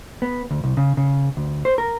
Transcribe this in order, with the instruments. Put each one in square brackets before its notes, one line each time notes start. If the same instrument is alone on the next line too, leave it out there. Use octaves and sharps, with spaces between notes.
[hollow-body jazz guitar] B3
D2
C2
C#3
C#3
D2
C5
A#4